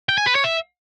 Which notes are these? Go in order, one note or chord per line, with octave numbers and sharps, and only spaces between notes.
G5
G#5
B4
C#5
E5